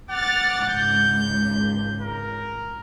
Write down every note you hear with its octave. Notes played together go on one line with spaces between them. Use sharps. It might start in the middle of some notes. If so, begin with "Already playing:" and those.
F#5 D6 F6 A6
G#1 C#2 G6
A#4